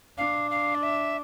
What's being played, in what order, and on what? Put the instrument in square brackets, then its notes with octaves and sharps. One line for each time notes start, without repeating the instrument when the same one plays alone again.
[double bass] D4 [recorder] F5
[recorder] F5
D5
E5